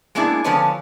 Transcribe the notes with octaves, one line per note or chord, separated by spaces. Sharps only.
G#3 A#3 B3 D4 E4 G#4
D3 F3 B3 B4 C#5 G#5